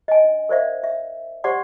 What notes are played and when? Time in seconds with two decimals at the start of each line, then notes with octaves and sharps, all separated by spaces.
0.08 D#5 G#5
0.24 D4
0.49 A#4 C5 D5 E5 F5
0.84 E5
1.44 G4 C5 D5 F#5 C6 D6